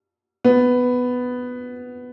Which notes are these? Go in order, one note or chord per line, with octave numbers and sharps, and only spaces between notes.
B3